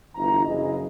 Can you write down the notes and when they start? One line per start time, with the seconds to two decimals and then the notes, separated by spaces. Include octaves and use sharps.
0.16 G1 D2 E3 A#5
0.46 F#1 E3 G#4 D#5